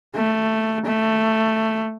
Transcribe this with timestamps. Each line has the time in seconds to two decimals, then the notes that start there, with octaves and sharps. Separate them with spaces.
0.15 A3
0.86 A3